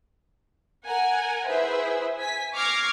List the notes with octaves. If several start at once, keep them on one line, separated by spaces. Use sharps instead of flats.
A#4 F#5 G#5
E4 G#4 B4 C5 E5
G#5 B6
C#6 D6 F6 G#6 A#6 C7